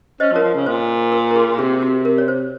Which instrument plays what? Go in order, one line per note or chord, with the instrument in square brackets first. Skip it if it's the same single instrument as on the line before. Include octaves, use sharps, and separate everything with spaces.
[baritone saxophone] C#4 [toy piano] C5 D#5
[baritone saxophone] F3
[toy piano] A#4 C#5
[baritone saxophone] F3
C#3
[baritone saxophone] A#2 [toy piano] C5
[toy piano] A#4
A#4
G#4
[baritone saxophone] C3 [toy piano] G#4
[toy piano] F#4
A#4
C#5
C5